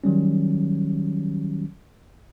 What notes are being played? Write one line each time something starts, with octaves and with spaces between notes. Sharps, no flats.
D#3 F#3 G3 C#4